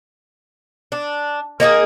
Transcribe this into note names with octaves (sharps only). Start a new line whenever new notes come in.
D4
A#3 D#4 F#4 G#4